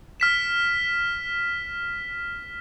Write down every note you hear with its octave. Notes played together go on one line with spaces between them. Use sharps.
F6 B6 E7